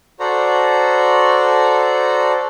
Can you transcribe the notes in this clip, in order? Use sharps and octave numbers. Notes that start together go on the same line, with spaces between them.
F#4 A4 C5 D5 A#5